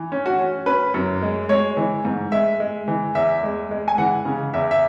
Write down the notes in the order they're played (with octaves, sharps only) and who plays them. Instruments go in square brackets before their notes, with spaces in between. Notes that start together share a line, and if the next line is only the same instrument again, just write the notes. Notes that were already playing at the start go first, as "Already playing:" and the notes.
Already playing: [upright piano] E3
C#4
F#4
C#4
C#4 B4
F#2
G#3
G#3 C#5
E3
G#2
G#3 E5
G#3
E3
E2 E5
G#3
G#3
G#5
E3 F#5
C#3
E2 E5
E5